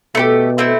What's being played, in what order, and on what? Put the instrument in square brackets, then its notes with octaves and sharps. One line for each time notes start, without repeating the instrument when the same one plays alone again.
[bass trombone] B2 [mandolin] A3 E4 G4
[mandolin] A3 C4 E4